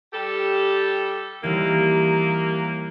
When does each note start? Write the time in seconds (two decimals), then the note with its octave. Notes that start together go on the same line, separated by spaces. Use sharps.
0.13 G3 G4 A4
1.44 D#2 E3 G3 A#3